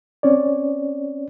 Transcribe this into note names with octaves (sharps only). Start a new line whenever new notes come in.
C4 C#4 C#5 D5